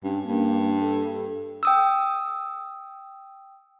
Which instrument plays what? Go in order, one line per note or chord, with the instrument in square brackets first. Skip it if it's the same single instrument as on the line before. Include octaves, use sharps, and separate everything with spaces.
[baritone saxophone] G2 [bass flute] C#4
[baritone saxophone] G2 [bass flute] A#3
[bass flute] A4
[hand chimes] G5 D#6 E6